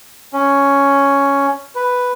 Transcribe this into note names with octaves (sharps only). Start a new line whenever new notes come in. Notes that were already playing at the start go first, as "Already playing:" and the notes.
C#4
B4